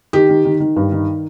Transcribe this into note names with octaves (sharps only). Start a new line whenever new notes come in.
D#3 G4
D#3
D#3
D#3
G2
D#3